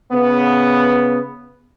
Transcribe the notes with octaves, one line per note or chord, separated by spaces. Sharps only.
C#3 B3